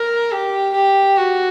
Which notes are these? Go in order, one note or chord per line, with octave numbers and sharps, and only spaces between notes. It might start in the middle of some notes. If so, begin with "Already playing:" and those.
Already playing: A#4
G4
G4
F#4